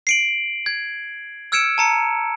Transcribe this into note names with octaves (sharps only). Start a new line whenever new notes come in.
C7 D7 F#7
G#6
E6 F6 G#6 C#7 D7 E7
A5 A#5 C#7